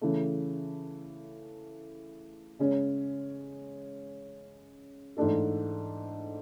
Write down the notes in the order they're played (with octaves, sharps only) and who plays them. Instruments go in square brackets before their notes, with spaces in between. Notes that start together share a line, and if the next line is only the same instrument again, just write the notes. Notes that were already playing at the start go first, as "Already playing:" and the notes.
[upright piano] C#3 E3 A3
C#3 G#3 C#4
G#2 E3 A3 D4 A4